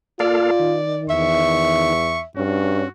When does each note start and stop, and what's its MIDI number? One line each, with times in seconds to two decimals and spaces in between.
0.20 0.51 58
0.20 0.77 65
0.20 0.51 69
0.20 1.05 74
0.20 0.51 77
0.60 1.93 51
1.10 2.24 40
1.10 2.25 76
1.10 2.21 85
2.37 2.83 43
2.37 2.89 61
2.37 2.90 66